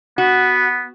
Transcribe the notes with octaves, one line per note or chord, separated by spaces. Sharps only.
B3 F#4